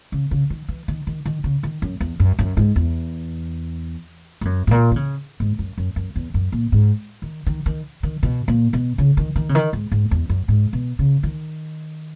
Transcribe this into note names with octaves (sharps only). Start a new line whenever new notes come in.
C#3
C#3
D#3
E3
D#3
D#3
D#3
C#3
D#3
F#2
E2
F#2
F#2
G#2
E2
G#2
F#2
G#2
A#2
D#3
C#3
G#2
F#2
F#2
F#2
E2
F#2
A#2
G#2
D#3
D#3
D#3
D#3
B2
A#2
B2
C#3
D#3
D#3
C#3
D#3
G#2
G#2
E2
F#2
G#2
B2
C#3
D#3